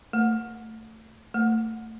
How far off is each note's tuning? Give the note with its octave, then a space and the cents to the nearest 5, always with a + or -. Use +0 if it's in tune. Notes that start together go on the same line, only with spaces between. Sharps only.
A3 +15
A3 +20